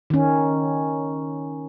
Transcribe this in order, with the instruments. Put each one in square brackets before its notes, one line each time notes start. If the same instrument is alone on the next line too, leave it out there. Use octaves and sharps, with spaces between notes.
[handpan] D#3 C#4